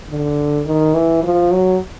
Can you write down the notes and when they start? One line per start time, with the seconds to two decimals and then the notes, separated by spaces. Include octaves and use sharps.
0.09 D3
0.66 D#3
0.95 E3
1.23 F3
1.52 F#3